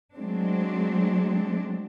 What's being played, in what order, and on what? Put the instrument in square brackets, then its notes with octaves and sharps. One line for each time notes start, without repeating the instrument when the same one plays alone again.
[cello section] F#3 G#3 A3 C4 D4